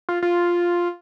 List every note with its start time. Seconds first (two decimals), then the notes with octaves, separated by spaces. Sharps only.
0.09 F4
0.22 F4